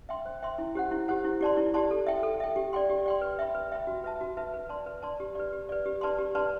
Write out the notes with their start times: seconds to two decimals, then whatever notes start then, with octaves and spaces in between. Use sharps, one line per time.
0.09 E5 G5 C6
0.26 C5
0.42 E5 G5 C6
0.58 E4
0.75 G4 C5 F#5
0.91 E4
1.08 G4 C5 F#5
1.24 E4
1.41 G4 D5 A5 C6
1.57 E4
1.74 G4 D5 A5 C6
1.91 A4
2.07 E5 G5
2.23 A4
2.40 E5 G5
2.56 G4
2.73 D5 G5 C6
2.90 G4
3.06 D5 G5 C6
3.21 B4
3.39 E5 G5 B5
3.55 B4
3.72 E5 G5 B5
3.87 F#4
4.04 B4 E5 A5
4.21 F#4
4.37 B4 E5 A5
4.54 B4
4.69 D5 A5 C6
4.86 B4
5.03 D5 A5 C6
5.20 G4
5.35 B4 D5
5.53 G4
5.69 B4 D5
5.86 G4
6.01 B4 D5 A5 C6
6.19 G4
6.35 B4 D5 A5 C6